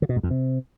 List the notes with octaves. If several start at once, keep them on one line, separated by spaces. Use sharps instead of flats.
D3
B2
G#2
F2
C3